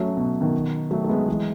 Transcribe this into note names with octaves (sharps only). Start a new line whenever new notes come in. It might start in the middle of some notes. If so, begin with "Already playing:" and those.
Already playing: F#3 A3 C#4
B2
B2 D#3
F#3 A3
A3
G#3 B3
E3 G#3